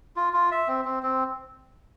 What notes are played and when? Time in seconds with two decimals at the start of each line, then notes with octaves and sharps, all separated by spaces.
0.16 F4
0.33 F4
0.51 E5
0.68 C4
0.85 C4
1.03 C4